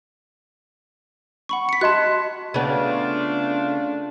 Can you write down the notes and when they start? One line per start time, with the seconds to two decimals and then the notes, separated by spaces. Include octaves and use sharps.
1.49 F#5 B5 C#6
1.69 B6 C#7
1.81 F#4 D#5 A5 C6 F#6
2.54 C#3 A3 B3 D4 F4